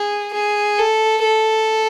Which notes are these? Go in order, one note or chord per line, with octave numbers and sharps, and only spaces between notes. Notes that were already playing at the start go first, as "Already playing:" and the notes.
Already playing: G#4
G#4
A4
A4